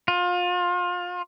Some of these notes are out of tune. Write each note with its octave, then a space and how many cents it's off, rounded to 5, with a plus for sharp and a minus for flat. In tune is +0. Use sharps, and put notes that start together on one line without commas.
F4 +30